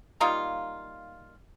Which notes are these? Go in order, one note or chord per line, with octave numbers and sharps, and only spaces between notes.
G3 A#3 D#4 F4